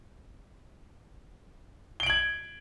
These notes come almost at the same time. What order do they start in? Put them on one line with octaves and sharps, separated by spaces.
G7 D7 F#7 G#6